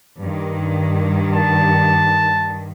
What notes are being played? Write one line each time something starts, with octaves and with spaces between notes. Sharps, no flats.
G2 D#3
A5